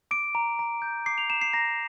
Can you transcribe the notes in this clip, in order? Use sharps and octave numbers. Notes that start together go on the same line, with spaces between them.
D6 D7
A#5
A#5
G6
D6 C7
F7
A#5 E7
C7
A#5 A#6